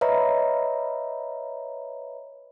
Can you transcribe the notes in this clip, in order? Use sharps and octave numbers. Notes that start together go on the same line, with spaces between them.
B4 C#5 D#5 E5 A#5 B5